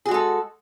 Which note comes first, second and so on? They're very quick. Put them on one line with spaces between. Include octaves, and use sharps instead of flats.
G#4 F#4 G#3 A4